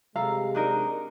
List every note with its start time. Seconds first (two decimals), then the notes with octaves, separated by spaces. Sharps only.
0.15 C3 G#3 A4 F5 A#5
0.55 D4 D#4 A#4